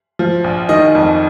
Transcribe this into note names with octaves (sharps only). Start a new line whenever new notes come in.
F3
A#1
D#3 D#5
F2